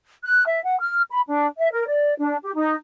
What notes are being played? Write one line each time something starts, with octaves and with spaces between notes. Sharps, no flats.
F#6
E5
F#5
F6
B5
D4
E5
A#4
D5
D4
G4
D#4